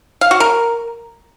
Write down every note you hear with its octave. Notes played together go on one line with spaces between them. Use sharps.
F5
F#4
A#4